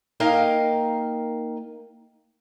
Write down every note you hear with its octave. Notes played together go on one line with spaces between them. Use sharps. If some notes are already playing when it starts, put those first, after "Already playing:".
A#3 D#4 A#4 D#5 F5 G5